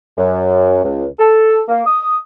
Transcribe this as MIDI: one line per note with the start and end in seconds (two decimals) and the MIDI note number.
0.17 0.81 42
0.84 1.06 37
1.19 1.61 69
1.69 1.82 58
1.86 2.17 87